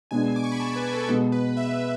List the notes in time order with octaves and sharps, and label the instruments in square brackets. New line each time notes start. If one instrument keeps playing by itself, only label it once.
[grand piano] B2 G#3 B3 D4 [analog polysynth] G#5
[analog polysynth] D6
C#6
B5
A5
B4
A4
[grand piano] B2 G#3 B3 [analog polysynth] A4
[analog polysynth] B4
E5